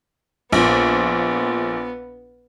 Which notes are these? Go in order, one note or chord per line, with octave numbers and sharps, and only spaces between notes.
A#1 A#2 B3